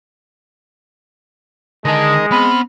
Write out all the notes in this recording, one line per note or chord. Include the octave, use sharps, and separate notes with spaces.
D3 D#3 G#3 A#4 D#5 A5
B3 C4 B5 F6